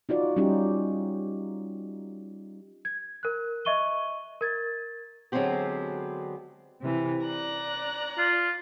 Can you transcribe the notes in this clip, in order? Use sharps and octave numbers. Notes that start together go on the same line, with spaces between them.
D#4 F4 F#4 D5
G3 C#4 D#4 F4 G4
G#6
A#4 F#6
D#5 E5 C#6 D#7 G7
A#4 G#6 A6
D3 F#3 G#3 B3 C4 G4
C3 E3
D5 A#5 F#6
F4